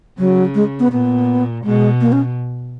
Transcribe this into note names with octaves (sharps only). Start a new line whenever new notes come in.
C#3 F#3
G#3
B3
A#2 B3
B2 G#3
A#3
C#4